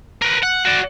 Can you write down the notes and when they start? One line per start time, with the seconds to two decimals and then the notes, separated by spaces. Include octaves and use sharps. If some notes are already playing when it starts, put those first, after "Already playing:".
0.22 A#4 B4
0.43 F#5
0.66 F#4 D5